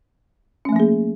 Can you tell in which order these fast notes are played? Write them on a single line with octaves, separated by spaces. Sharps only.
C#4 A3 F3 A#3 G#4